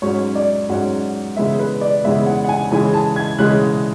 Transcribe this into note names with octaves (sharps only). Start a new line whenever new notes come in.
G#2 F#3 C#4 C#5
D5
G#2 F#3 C#4 F#5
C#3 E3 G#3 B3 E5
B4
D5
C#3 E3 G#3 B3 E5
F#5
F#5
G#5
C#3 E3 G#3 G#5
A5
G#6
C#3 E3 G#3 F#6